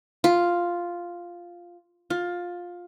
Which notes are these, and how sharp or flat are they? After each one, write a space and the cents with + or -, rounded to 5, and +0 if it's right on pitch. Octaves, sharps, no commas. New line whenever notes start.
F4 +0
F4 +15